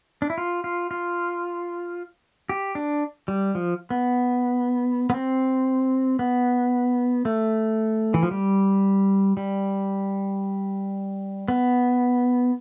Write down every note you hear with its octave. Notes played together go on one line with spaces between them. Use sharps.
D4
E4
F4
F4
F4
G4
D4
G3
F3
B3
B3
C4
B3
A3
E3
F3
G3
G3
B3